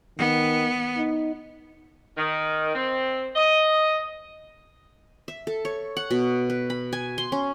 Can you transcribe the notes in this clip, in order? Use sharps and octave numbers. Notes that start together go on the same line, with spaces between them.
D#3 B3
D#4
D#3
C4
D#5
E5
A4
C#5
F#5
B2
B4
B5
G#5
C6
C#4